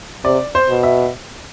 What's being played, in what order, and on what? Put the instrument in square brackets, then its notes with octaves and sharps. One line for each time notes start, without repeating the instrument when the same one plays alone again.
[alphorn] C3 [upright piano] D5
[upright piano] C5
[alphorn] B2
[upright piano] E5